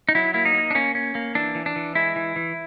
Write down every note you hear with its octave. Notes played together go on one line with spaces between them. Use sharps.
D#4
F#3 E4
A#3 E4
D#4
A#3
D4
A#3 C#4
C#4
A#3
E3 D4
E3
D4
E3
G#3 E4
E3
E3